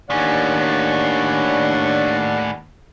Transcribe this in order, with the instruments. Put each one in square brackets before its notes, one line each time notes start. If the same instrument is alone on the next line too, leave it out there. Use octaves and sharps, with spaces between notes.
[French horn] D#2 [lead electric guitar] A2 C#4 [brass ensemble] D4 C#5 [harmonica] D5 F#5